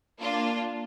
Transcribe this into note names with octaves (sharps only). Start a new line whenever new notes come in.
A#3 D4 F4